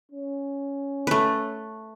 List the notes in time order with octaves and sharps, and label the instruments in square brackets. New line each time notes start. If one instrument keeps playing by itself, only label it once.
[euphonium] C#4
[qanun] A3 B4